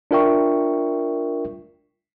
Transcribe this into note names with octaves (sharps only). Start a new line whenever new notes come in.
D4 F4 A#4 E5 G5 C#6